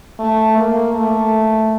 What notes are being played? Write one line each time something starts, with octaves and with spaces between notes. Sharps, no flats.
A3
A#3
A3